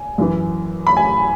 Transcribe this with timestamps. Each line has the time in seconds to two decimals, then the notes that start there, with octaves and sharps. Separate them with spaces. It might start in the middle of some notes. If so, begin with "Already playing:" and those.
Already playing: G#5
0.18 F#2 E3
0.87 B5
0.97 G#5